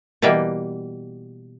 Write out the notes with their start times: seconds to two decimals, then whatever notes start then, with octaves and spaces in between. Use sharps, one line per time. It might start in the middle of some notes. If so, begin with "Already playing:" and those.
0.22 B2 E3 G3 A#3 G5